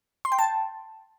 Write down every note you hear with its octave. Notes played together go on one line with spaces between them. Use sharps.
C6
G5
A5